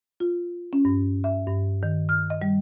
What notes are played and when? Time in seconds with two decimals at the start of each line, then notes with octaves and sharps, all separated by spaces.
0.20 F4
0.73 C#4
0.85 G2
1.24 E5
1.47 G2
1.83 D#3
2.09 F6
2.30 D#5
2.42 G3